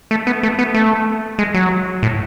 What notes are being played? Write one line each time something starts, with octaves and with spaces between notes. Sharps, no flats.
A3
B3
A3
B3
A3
G#3
F#3
A2